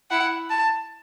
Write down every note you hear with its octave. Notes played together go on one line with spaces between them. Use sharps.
E4 F#5
A5